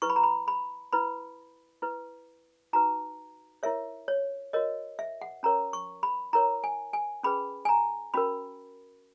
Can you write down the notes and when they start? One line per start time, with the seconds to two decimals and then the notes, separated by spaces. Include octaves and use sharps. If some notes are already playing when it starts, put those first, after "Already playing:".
0.02 E4 B4 C#6
0.10 B5
0.16 A#5
0.23 B5
0.48 B5
0.93 E4 B4 B5
1.82 E4 B4
2.73 D#4 F#4 B4 A#5
3.63 E4 A#4 C#5 E5
4.08 C#5
4.53 F#4 A#4 C#5 D#5
4.99 E5
5.22 F#5
5.43 C#4 F#4 A#4 C#5 A#5
5.73 C#6
6.03 B5
6.33 E4 A#4 C#5 A#5
6.64 G#5
6.93 G#5
7.23 C#4 G#4 B4 B5
7.65 G#5
7.69 A#5
8.14 C#4 F#4 A#4 B5